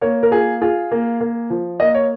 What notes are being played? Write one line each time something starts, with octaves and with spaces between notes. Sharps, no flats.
A#3 C#5
A#4
F4 G#4
F4 G#4
A#3
A#3
F3
A#3 D#5
C#5